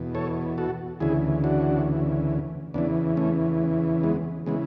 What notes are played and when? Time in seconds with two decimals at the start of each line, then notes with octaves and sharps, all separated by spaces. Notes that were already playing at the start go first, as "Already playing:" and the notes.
Already playing: E2 B2
0.15 A4 C#5
0.58 F#4 A4
1.00 D2 C#3 E3 E4 G#4
1.44 D4 F#4
2.74 E2 C#3 E3 B3 D4
3.17 A3 C#4
4.03 G#3 B3
4.46 C#3 E3 G#3 B3